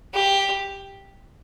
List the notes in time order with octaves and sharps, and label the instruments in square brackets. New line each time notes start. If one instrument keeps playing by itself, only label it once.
[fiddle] G4